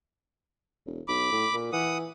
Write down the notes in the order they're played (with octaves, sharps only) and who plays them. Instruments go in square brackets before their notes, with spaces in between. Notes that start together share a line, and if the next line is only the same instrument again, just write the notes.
[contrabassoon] E1
[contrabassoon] B1 [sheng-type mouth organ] B5 D6
[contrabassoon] A2
A#2
[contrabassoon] E3 [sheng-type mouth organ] F#5 D#6